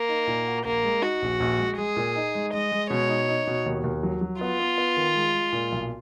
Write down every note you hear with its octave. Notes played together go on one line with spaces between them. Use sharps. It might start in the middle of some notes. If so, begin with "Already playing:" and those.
Already playing: A#3
D#4
A#2
F#4
A#1 A#3
G#3
D#4 F#4
A#1
A#1
G#3
G#3 G#4
A#2
D#4
G#3
G#3 D#5
G#3
B2 C#5
D#4
D#4
B2
D#2
D#2
F#3
F#3
B3 F4
B3
B3
D#3
G#3
G#3
A#2
B1